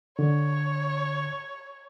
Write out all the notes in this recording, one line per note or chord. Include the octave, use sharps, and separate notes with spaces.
D3 C#5